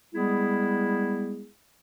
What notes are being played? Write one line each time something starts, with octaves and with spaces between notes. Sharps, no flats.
G3 G#3 B3 E4 G#4